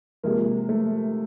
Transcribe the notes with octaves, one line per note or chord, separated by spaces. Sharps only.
C3 F3 G#3 A#3
A3